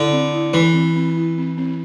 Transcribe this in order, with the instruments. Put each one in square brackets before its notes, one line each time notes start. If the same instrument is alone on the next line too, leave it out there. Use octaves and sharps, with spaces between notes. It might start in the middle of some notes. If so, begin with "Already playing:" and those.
Already playing: [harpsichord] D3 [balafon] E4
[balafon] C4
E4
[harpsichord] E3 [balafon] B4
[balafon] C4
C4
E4
C4
C4